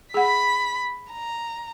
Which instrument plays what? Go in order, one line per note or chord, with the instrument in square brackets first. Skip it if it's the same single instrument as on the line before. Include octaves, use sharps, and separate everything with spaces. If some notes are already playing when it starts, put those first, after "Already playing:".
[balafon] G#4 F#5 [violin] B5 B6
[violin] A#5